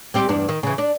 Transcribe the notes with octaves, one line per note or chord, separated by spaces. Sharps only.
G3 C4 G4
E2 G2 D4
D#3
C#3 E3
D4